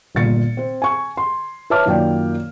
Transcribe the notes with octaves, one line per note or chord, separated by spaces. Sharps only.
G1 A#2 A6 C#7
C4 C5
G#5 C#6
C6
B4 C#5 E5 A5 D6 F6
F#2 D#3 A#3 F4 D5 G5